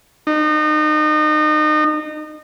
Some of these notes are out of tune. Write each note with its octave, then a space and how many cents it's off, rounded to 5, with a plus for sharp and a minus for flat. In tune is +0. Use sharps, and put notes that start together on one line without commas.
D#4 -30